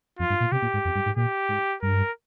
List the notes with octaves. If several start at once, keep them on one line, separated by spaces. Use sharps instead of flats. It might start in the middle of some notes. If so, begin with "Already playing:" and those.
F2 F4
G2
A#2
C3 G4
A#2
G#2
F2
G2
G#2
A#2 G4
G#2
G2 A#4